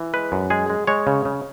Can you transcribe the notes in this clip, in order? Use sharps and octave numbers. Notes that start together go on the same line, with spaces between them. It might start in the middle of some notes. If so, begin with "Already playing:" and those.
Already playing: E3
G#3 B4
F#2
G#3 G#4
G#3
G#3 C#5
C#3
C#3